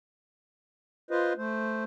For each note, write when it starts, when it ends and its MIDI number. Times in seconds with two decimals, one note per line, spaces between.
1.11 1.33 65
1.11 1.33 71
1.11 1.33 72
1.11 1.33 75
1.37 1.84 57
1.37 1.84 72